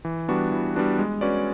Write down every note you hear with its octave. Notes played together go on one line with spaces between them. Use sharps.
E3
G3 B3 D4 F#4
E3
G3 B3 D4 F#4
G#3
C#4 F#4 B4 D5